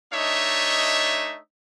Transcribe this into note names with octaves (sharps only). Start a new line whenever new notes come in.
A3 D4 D#4 C#5 D#5 E5